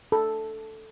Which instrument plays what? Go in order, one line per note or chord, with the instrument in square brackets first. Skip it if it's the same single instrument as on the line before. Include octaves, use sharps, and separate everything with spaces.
[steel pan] A4